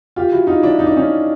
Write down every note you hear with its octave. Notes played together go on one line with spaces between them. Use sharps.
F4 G4
E4 F#4
D#4 F4
D4 E4
D#4
D4
C#4 D#4